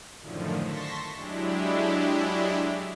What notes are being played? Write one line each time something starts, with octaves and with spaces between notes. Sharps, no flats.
F#2 A2 D3 D#3 F3
A5 C6 C#6 A#6 B6
F#3 G#3 D4 E4 G4